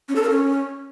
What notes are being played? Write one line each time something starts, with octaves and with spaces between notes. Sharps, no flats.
C#4
A4
A#4
C#4